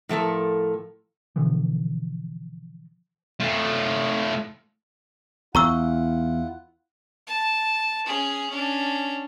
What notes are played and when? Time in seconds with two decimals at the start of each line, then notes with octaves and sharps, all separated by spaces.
0.09 A2 F3 A4 A#4
1.36 B2 D3 E3 F3
3.40 A3 F4
5.55 E2 E4 F4 F#5 A#5 C#6 E6
7.27 A5
8.06 C#4 G#4
8.50 C#4 D4